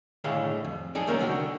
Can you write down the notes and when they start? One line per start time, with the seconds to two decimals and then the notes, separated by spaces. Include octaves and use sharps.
0.24 A2 D3 D#3 A3 G#4 F5
0.64 F2
0.95 D4 D#4 G#4 A4
1.07 D#3 A3 A#3 C#4 A4 A#4
1.19 C2 D3 D#3 F#4